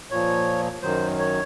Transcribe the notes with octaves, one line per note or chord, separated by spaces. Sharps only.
A#2 F3 C#5
F#2 D#3 F#3 C5
C#5